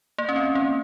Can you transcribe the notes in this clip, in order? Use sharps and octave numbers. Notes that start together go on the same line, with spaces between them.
A#3
C#4
C4
A#3